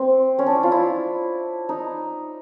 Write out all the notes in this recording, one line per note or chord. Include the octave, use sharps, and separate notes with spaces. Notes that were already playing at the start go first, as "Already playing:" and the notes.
Already playing: C4
C#4
D4
E4
F4
E4
D#4